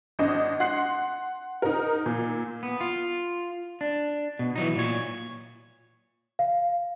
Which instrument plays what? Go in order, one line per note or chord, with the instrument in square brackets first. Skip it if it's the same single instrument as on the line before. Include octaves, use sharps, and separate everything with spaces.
[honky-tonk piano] G#1 D4 D#5
F#5 C6 F#6 C7
D#4 A#4
A#2
[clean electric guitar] B3
F4
D4
B2
E3 F#3 D#4
A#2 C#5
[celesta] F5